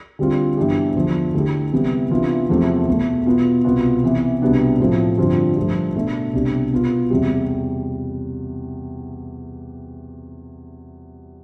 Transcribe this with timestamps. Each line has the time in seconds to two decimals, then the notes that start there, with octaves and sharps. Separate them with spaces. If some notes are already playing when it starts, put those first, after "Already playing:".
0.19 D3 G3 C4 F4
0.57 G2 E3 B3 D4 G4
0.95 E2 D3 F3
1.34 D3 A3 E4 G4
1.72 C3 E3 G3 B3
2.11 C3 E3 B3 D4 F4
2.49 E2 C3 F3 A3
2.87 E2 B2 A3
3.26 B2 B3 F4
3.64 C2 B2 B3 F4
4.03 C3 E3 B3
4.42 C2 B2 G3 B3 D4
4.80 A2 F3 A3 C4 F4
5.18 G2 D3 F3 C4 F4
5.56 G2 F3 A3
5.95 B2 A3 D4
6.33 C2 B2 G3 D4
6.72 B2 B3 F4
7.10 E2 C3 G3